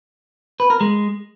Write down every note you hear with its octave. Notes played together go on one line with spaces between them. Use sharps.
B4
A#4
G#3